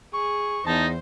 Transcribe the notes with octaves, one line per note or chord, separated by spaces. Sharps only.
G#4 C#6
E2 D#4 C5 A5